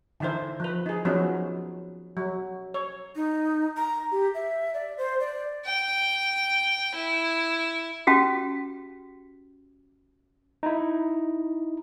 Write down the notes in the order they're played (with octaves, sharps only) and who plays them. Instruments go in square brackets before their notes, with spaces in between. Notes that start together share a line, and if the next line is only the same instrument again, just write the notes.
[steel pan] D3 E3 D#4 E4 C5
F3 B4
D#4 G#4
F3 F#3 B3 C#4 D#4
F#3
C#5
[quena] D#4
A#5
G4
E5
D5
C5
D5
[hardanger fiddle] G5
E4
[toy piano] C#4 F#4 G4
[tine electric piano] D#4 E4